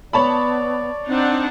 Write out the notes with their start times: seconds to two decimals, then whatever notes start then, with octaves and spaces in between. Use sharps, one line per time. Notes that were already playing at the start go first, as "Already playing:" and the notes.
0.13 B3 C#5 D5 A5 B5
1.07 C4 D4 D#4 F#5